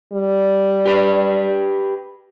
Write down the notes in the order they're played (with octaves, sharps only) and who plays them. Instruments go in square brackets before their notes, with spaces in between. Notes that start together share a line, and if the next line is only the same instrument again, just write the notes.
[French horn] G3
[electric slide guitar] G4 B4